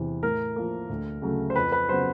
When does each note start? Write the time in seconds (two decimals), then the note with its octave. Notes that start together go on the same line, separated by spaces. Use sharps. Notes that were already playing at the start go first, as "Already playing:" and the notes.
Already playing: E2 C3 E3
0.23 A2 A#4
0.56 F3 A#3
0.90 D2
1.22 C#3 F#3 A3
1.50 C5
1.56 F2 B4
1.72 B4
1.89 C#3 F#3 B3 C5